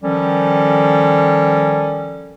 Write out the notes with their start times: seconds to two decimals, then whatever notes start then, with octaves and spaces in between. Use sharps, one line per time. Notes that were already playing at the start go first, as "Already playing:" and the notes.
0.03 D#3 F3 G3 C#4 A4